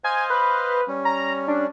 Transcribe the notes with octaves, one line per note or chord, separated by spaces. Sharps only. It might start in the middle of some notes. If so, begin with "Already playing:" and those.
C5 D#5 F5 G#5
B4
G3 C#4
A#5
D4